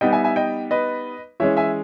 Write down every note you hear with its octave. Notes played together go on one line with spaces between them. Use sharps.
G3 B3 D#4 D#5 G5
E5 G#5
E5 G#5
D#5 G5
B4 D#5
E3 G#3 C#4 C#5 E5
E5 G#5